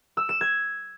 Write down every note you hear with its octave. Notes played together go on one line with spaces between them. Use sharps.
E6
E7
G#6